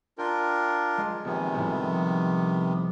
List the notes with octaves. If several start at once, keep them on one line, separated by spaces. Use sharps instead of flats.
D4 F4 A#4 G5
G#3
A#1 C3 D#3 B3 G#5
C2 A2 F3